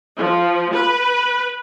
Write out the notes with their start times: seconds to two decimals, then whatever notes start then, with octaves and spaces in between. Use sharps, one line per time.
0.18 F3
0.74 B4